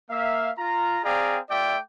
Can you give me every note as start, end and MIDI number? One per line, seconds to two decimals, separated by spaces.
0.10 0.51 58
0.10 0.51 76
0.10 0.51 77
0.58 0.99 65
0.58 0.99 82
1.04 1.39 60
1.04 1.39 68
1.04 1.39 74
1.04 1.39 77
1.04 1.39 79
1.04 1.39 82
1.50 1.77 57
1.50 1.77 65
1.50 1.77 74
1.50 1.77 76
1.50 1.77 79
1.50 1.77 86